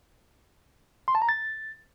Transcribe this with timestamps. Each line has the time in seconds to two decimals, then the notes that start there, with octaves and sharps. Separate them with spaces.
1.08 C6
1.15 A5
1.22 A#5
1.29 A6